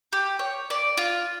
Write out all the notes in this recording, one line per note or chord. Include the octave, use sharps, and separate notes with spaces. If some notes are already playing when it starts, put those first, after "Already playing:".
G4
C#5
D5
F4